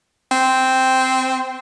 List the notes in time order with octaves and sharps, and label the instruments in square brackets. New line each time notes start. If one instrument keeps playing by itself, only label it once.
[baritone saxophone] C4